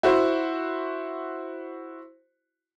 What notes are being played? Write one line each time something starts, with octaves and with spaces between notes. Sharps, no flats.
E4 F#4 C5